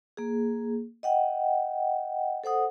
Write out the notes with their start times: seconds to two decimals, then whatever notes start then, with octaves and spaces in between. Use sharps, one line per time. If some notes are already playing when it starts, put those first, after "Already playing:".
0.17 A#3 G#4
1.03 D#5 F#5 G5
2.44 A4 C5 F#5 D#6